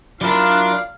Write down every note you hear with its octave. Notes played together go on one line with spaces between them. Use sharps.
F#3 E4 F4 A#4 D5 F5 A5